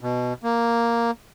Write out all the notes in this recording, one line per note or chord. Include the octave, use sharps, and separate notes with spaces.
B2
A#3